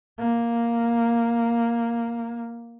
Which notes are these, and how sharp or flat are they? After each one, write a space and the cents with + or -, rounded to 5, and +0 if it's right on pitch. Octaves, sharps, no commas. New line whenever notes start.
A#3 +0